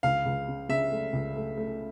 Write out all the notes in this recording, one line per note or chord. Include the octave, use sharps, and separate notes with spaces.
C#2 F5
C#2
C#3
C#3 E5
A3
C#2
A3
A3